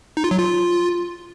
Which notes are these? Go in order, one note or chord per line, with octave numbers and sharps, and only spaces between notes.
D#4
F4
F#3
F4